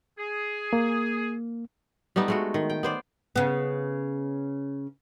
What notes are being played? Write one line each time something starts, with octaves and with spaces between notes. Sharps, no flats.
G#4
A#3
G3 A3 B3 D#4
G#3 A3 F#4
D#3
G5
B3 C5 D5
C#3 B3